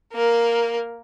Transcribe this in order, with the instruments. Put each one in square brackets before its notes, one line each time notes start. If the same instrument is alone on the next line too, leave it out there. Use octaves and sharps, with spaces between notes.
[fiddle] A#3 A#4